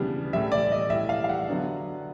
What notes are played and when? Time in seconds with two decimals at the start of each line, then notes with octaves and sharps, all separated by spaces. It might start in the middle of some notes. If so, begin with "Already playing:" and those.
Already playing: C#3 E3 G3 B3 D4
0.33 A2 E3 G3 E5
0.52 D5
0.72 D#5
0.90 A2 E3 G3 E5
1.09 F5
1.24 F5
1.29 F#5
1.49 D3 F#3 B3 D4